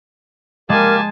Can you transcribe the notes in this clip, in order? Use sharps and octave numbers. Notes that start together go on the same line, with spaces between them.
G#3 A#3 G4 A#4 G#5 A5